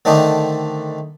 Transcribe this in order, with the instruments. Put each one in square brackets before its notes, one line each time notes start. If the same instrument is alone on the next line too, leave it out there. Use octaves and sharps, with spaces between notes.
[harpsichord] D3 D#3 A3 C4 D4 D#4